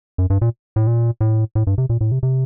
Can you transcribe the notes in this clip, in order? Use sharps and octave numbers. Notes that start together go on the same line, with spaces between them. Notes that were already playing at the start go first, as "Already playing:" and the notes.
F#2
G2
A#2
A2
A#2
A2
A2
G2
C3
A#2
A2
C3
C3